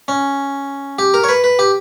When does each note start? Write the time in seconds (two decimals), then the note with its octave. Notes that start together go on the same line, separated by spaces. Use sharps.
0.08 C#4
0.99 G4
1.14 A#4
1.24 C#5
1.29 B4
1.44 B4
1.59 G4